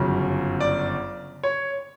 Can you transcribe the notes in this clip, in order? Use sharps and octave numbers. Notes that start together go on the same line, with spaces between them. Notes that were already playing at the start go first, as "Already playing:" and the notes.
Already playing: G1 F#2 C#3
D5
C#5